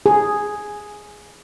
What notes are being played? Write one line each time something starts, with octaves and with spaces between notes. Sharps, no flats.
G#4